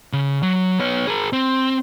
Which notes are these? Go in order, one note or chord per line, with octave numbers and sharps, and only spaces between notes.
C#3
F#3
B3 C#5
G#4 A#4
C4